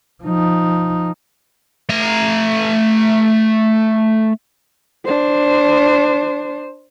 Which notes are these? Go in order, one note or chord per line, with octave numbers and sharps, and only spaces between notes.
F3 D#4
A3 A#5
D4 C5